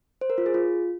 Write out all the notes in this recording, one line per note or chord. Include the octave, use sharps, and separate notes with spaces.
C5
A#4
F4
G#4
F4